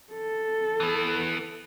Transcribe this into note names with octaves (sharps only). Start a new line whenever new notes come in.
A4
E3 B3